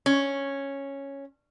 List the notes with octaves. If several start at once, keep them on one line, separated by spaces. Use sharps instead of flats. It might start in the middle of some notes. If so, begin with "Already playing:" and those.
C#4